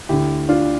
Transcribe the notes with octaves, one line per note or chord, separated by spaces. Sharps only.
D2 D3 E4 G4
D4 F4